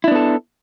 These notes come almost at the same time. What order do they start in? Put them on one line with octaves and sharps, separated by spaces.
E4 D4 B3 A4